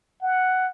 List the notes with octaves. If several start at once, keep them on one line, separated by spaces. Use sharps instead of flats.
F#5